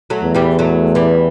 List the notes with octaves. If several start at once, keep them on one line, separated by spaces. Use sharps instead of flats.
F#3 A3
E2
E3 G3
F#3 A3
E3 G3